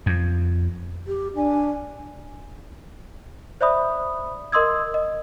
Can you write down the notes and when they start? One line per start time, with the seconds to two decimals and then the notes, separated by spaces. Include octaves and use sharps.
0.06 F2
1.07 G4
1.36 D4 G#5
3.61 C5 D5 E5 B5 D#6
4.52 A#4 D#5 C6 D#6 E6 G#6
4.94 D#5